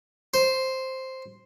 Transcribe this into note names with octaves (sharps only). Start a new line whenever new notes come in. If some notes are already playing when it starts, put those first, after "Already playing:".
C5